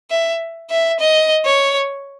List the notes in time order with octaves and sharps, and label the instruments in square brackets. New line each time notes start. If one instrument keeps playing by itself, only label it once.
[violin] E5
E5
D#5
C#5